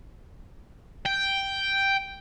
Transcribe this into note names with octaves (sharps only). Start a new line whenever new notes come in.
G5